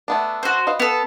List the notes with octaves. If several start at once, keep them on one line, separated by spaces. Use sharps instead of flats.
A3 B3 D4
F#4 C5
B4 D#5 F5
B3 A4